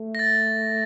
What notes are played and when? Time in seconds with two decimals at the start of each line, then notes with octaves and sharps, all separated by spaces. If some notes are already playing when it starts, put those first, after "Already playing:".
Already playing: A3
0.15 A#6
0.19 A6